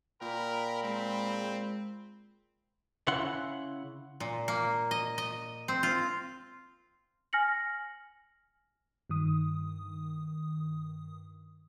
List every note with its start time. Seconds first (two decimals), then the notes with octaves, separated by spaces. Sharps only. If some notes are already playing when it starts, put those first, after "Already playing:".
0.21 A#2 A#4 G5 B5
0.84 G#3 C4
3.08 C#3 E4 F#5 C6
4.20 A#2
4.48 A#3
4.91 D#5
5.18 D#5
5.68 C4
5.83 F4
7.33 G#5 F6 A#6 C#7 F#7
9.09 G2 D#3 D#6